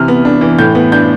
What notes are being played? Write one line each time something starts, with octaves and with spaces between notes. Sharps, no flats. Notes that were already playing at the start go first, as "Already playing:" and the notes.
Already playing: C3 E3 F6
B3
D4
E3
A2 G6
B3
D4 G6